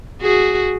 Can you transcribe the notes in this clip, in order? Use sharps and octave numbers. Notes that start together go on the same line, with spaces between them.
F#4 G#4